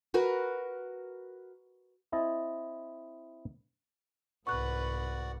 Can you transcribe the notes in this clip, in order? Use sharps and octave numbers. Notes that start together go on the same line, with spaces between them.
F#4 A#4 B4
C4 E4 D#5 A5
C2 G#2 F#4 B4 D5 F#5 C#6 F#6